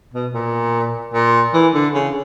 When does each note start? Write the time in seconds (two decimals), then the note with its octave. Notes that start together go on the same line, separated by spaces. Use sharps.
0.13 B2
0.34 A#2
1.14 A#2
1.54 E3
1.74 D3
1.95 C#3